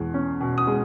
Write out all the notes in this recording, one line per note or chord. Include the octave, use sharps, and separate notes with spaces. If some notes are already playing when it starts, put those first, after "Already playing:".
Already playing: E2 B2 G#3
C#4
B2
D#6
G#3